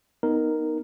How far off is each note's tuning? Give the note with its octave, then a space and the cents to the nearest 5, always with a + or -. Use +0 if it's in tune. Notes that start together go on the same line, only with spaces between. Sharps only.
B3 +0 D#4 +0 A#4 +0